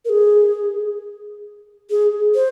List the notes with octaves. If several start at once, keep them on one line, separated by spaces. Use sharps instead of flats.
A#4
G#4
G#4
C5